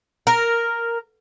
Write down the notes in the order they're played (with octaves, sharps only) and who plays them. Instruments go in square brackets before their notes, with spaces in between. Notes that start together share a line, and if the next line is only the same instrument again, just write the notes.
[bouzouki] A#4